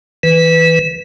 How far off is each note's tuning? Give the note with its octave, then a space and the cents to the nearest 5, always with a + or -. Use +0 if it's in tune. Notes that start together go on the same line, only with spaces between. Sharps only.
E3 -20 B4 +10